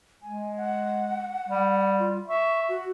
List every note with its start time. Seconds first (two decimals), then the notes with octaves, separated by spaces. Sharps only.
0.23 G#3 G#5
0.57 F#5
1.49 G3
2.00 F4
2.28 E5 C#6
2.69 F#4